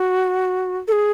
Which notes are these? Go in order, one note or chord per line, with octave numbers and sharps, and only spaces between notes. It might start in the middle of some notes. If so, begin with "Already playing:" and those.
Already playing: F#4
A4
G#4